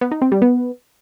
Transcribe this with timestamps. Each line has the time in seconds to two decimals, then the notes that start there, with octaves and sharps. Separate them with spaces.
0.01 B3
0.11 D#4
0.22 C4
0.32 G3
0.42 B3